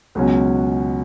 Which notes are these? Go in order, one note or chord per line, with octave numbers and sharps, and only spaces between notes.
C#2 B2 F#3 C#4 F#4